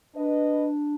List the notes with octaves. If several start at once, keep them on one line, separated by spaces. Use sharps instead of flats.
D4 B4 D#5